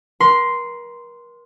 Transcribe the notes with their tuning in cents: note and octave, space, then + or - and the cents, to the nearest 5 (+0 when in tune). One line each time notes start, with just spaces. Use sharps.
A#4 +40 C6 -5